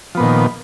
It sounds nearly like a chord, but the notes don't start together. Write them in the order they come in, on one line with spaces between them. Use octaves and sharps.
F3 B3 A#2 D#3